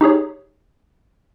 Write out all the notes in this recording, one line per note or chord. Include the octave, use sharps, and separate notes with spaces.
D#4 G4 G#4 C#5